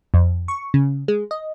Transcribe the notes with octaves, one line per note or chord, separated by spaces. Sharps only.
F2
C#6
C#3
G#3
D#5